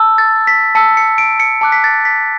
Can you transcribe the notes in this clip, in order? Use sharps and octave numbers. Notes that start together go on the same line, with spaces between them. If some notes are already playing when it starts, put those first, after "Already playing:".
Already playing: A5 E6
A6
B6
A5 E6 C#7
C#7
D7
C#7
A5 D6 F#6
B6
A6
B6